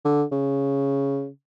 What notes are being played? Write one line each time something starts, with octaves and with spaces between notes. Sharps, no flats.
D3
C#3